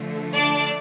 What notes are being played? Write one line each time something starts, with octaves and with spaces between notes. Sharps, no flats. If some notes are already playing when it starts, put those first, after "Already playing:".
Already playing: D3 F3 A3
D4 D5